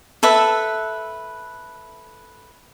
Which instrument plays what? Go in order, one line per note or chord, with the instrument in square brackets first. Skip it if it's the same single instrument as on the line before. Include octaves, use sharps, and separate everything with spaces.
[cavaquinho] A4 B4 E5